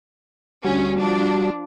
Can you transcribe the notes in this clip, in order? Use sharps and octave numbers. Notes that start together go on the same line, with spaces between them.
D2 G3 C#4 F#4
F3 D4